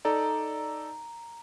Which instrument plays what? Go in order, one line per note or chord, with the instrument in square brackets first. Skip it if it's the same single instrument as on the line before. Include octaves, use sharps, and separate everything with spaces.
[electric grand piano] D#4 A4 D5 [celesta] A#5